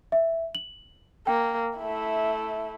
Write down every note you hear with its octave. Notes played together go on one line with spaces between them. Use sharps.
E5
F#7
A#3 G5
A3 E4